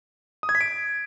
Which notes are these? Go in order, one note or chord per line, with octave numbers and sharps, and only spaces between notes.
D#6
G#6
B6
D7